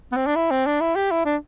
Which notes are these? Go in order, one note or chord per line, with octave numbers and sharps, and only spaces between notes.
B3
C4
D4
E4
C4
D4
E4
G4
E4
D4